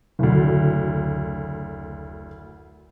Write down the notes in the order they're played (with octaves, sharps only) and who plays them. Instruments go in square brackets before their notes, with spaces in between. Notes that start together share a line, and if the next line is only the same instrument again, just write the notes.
[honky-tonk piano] F#1 D2